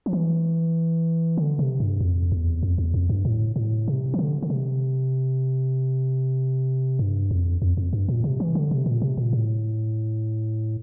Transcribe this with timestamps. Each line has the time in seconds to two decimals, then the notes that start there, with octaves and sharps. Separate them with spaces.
0.06 F3
0.13 E3
1.38 D3
1.59 C3
1.80 G2
2.01 F2
2.32 E2
2.63 F2
2.78 E2
2.94 F2
3.09 G2
3.25 A2
3.56 A2
3.88 C3
4.14 E3
4.19 D3
4.42 D3
4.50 C3
6.99 G2
7.31 F2
7.62 F2
7.77 F2
7.93 G2
8.09 A#2
8.24 C3
8.40 E3
8.55 D3
8.71 C3
8.86 A#2
9.02 C3
9.17 A#2
9.33 A2